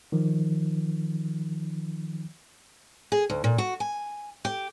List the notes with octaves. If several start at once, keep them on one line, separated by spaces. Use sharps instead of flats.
D#3 F3
G#4
D2
A#2
F#4
G#5
G4